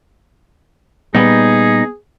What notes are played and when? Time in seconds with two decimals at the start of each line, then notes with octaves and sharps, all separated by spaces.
1.15 A#2 G3 B3 D#4 G#4